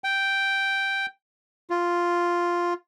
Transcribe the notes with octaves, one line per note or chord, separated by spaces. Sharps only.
G5
F4